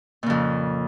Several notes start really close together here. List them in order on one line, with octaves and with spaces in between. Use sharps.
A#2 C#3 F2